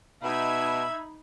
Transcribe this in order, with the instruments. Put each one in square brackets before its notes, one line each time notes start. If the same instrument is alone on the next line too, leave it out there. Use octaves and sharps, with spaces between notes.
[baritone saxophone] B2 [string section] D#4 B5 G#6 [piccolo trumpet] E5